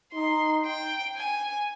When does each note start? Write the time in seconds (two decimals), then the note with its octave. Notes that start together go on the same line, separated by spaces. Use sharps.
0.13 D#4 C6
0.65 G5
1.17 G#5